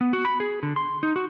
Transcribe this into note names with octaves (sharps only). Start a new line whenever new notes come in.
B3
F#4
B5
G#4
D3
C6
D#4
F#4